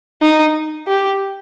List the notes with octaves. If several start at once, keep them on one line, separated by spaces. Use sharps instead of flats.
D#4
G4